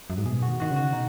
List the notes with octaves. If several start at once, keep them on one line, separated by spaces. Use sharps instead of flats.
F#2
G#2
B2 G#4
F#4
D#3
D#3 F#4
C#3
F#4
B2 D#4